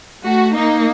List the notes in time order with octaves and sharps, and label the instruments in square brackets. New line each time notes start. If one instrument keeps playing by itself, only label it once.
[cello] A3 [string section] F#4
[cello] A#3 [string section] D#4